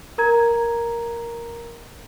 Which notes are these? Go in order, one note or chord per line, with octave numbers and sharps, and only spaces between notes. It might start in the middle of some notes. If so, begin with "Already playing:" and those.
A#4 A#5 G#6